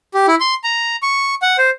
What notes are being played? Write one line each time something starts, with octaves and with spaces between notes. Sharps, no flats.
G4
E4
C6
A#5
C#6
F#5
C5